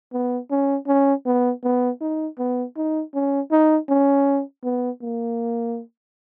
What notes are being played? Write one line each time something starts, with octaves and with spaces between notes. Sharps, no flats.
B3
C#4
C#4
B3
B3
D#4
B3
D#4
C#4
D#4
C#4
B3
A#3